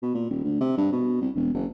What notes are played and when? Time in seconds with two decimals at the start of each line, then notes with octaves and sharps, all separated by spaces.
0.03 B2
0.15 A#2
0.30 D#1
0.44 D2
0.61 C3
0.77 G2
0.93 B2
1.21 C2
1.35 E1
1.54 F#1